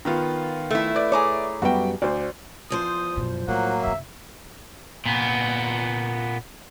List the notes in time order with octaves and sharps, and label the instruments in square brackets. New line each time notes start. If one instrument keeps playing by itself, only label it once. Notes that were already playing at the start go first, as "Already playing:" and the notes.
[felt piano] D#3 B3 F4
[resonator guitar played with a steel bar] A3 E4
[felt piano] B4 D5
[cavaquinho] G#4 A#5 D6 [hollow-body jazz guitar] C#5
[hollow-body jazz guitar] F#2 G3 B3 [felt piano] F#4 B4 G5
[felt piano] D2 [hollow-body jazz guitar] C5 D5
[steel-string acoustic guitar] E2 F3 C5 [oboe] D#6
[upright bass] F#2 B2
[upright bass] A2 [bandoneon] F#3 A#3 [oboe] F#5
[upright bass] F#1 C3 [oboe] E5
[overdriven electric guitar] A#2 B3